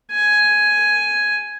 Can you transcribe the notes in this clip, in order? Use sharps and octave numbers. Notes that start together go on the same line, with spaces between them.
G#5